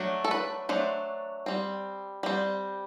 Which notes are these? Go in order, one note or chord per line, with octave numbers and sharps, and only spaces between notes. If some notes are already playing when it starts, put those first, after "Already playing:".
Already playing: F#3 A3 D4
A4
B4
F#3 A3 D4 C5
G3 C4
G3 C4